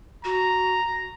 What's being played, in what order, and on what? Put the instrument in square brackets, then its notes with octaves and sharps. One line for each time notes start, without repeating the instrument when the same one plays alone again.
[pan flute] F#4 [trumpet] A#5